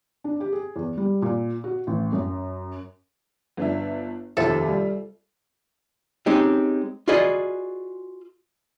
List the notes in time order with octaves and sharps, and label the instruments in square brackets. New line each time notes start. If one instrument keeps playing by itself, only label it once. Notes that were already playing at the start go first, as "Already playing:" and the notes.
[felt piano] D4
G4
G#4
E2
G3
A#2
F#4
A1
F#2
[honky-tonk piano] G1 D4 E5
[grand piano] F1 D#2 C3 [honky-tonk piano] F4 C5 E5 [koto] A4
[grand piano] G3
[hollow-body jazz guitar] G#3 C4 C#4 D#4 G4
F4 F#4 G#4 B4 D5 D#5